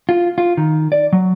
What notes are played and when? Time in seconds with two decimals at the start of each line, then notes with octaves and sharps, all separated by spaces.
0.09 F4
0.38 F4
0.57 D#3
0.92 D5
1.13 F#3